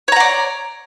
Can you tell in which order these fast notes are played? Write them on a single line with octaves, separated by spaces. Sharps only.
C#5 A#5 F#5 D5